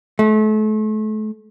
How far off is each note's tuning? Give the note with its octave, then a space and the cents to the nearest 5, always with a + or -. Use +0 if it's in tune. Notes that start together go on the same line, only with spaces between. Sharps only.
A3 -35